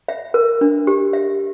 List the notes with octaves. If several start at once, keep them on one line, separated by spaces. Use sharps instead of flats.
E5
A#4
D4
G4
E5